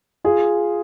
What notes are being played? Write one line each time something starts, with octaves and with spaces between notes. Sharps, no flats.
F4 G#4